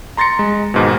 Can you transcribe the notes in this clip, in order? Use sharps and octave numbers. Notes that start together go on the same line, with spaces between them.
A#5 C6 A6 A#6 C#7
G#3
D#2 G#2 B2